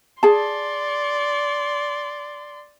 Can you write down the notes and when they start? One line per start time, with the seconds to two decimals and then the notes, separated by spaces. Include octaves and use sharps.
0.23 G#4 D5 A5 C6